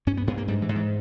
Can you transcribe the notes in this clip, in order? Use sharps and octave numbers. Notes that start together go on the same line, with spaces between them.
G2 C#4
B3
G2 B3
A#3
G#2 G3
E3
G#2
E3